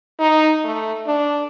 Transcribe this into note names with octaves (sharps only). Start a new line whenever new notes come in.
D#4
A3
D4